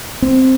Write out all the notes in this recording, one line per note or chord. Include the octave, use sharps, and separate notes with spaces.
C4